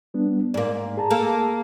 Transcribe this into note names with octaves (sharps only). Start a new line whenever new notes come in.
G3 B3 D4
G#2 A#3 D5
G#4 A5 A#5
A#3 A4